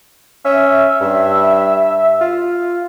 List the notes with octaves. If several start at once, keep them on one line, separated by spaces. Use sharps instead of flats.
C#4 E5
G2
F4